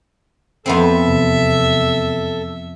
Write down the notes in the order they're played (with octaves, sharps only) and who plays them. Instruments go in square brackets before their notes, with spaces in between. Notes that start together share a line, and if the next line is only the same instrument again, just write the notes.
[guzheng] F2 B3 C4 [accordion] A4 [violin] E5
[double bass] E2 C3